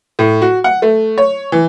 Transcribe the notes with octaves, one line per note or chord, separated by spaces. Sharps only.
A2
F#4
F#5
A3
C#5
E3